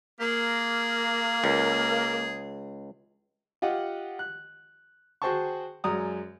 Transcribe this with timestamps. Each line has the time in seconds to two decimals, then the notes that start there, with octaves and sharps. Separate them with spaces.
0.20 A#3 G#4
1.44 C#2
3.62 F4 G4 D#5 F#5
4.19 F#6
5.22 F#4 G#4 C5 G5 A5 C#6
5.84 F#2 G#3 D5 A#5 D#6